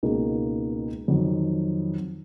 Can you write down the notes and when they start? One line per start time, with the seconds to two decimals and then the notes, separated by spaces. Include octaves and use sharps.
0.03 C#2 B2 A#3 D#4 G#4
1.08 F2 D#3 F#3